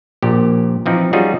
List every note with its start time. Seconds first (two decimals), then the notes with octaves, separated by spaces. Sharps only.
0.22 A#1 A#2 G4
0.86 E3 F3 C4 D#4
1.13 G3 C#4 D#4 F4 F#4 G#4